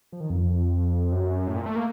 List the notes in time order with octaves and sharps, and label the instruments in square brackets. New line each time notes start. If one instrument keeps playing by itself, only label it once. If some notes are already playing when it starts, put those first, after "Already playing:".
[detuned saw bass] F3
D#3
F2
F#2
A2
A#2
A3
A#3